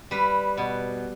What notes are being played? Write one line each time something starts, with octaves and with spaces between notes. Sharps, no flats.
G3 B4
B2